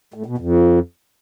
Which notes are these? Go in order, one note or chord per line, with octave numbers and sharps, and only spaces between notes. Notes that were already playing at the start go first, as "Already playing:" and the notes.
A2
B2
F2